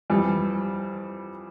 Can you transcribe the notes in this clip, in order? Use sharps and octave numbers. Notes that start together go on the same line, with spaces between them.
F2 E3 G3